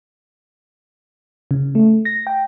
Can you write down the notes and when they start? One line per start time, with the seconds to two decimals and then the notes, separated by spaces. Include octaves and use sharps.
1.51 C#3
1.75 A3
2.05 A#6
2.27 G5